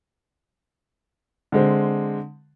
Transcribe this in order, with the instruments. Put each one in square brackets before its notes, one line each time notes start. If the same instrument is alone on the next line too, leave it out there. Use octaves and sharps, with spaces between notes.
[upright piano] D3 G#3 C4